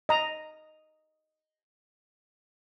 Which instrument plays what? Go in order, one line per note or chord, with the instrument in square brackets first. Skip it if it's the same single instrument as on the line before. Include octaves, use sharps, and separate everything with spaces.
[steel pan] D#5 A#5